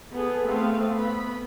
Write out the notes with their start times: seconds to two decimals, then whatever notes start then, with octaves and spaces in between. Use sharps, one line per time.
0.15 B3 G#4 A4
0.46 A3 B3 C4 F5
0.96 B3 B5